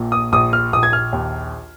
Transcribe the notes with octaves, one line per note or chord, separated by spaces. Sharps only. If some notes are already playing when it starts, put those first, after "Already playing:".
Already playing: A#1 A#2
D#6
A#1 D#6
F6
A#1 D#6
G#6
F6
D#2